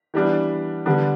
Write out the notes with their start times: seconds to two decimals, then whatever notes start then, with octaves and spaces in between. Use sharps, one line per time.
0.14 E3 G3 B3 D4
0.86 D3 G3 B3 D4